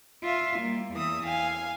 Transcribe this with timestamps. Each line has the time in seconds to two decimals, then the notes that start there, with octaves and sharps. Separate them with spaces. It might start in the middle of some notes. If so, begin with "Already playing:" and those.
0.23 F4 E5 F5
0.59 G3 A#3
0.93 E2 E3 E5 D#6
1.25 F5 G#5